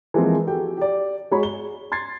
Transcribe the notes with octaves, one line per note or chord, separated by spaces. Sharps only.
E3 F3 G#3 A#3 C4
F#4 G4 A4 G5
G4 D5
G#3 F#4 C#5 B5
G7
C6 G#6 A6 C7